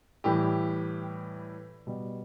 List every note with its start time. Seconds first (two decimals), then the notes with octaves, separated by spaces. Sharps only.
0.24 A2 E3 G3 G4
1.87 B2 G3